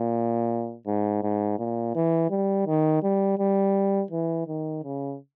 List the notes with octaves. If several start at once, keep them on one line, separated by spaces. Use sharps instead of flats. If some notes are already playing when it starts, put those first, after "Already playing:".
Already playing: A#2
G#2
G#2
A#2
E3
G3
D#3
G3
G3
E3
D#3
C#3